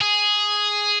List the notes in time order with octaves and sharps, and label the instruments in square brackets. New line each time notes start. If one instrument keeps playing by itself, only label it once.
[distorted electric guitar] G#4